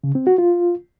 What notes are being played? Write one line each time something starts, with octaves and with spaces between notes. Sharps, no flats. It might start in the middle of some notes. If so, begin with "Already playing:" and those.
C#3
C4
F#4
F4